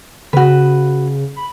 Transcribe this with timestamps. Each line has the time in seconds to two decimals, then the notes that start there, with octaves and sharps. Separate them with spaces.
0.33 C#3 F#4 B4
1.36 B5